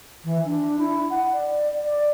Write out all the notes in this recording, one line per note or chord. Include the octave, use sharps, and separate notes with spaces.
E3
D4
E4
F#5
D5
D5